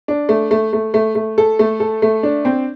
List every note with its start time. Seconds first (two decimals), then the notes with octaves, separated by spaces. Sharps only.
0.08 D4
0.29 A3
0.51 A3
0.73 A3
0.94 A3
1.15 A3
1.38 A4
1.59 A3
1.80 A4
2.02 A3
2.23 D4
2.45 C4